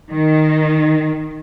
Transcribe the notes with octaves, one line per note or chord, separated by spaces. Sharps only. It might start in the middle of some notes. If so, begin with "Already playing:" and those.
D#3